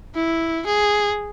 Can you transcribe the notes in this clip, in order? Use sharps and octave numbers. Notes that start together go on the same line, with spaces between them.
E4
G#4